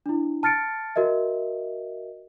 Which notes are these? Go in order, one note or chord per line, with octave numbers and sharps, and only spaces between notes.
D4 E4
A5 F6 A6 C#7 D7
F#4 A#4 D#5 E5